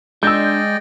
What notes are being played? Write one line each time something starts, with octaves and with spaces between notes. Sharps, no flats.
G#3 D4 D5 D#5 G5 E6 G6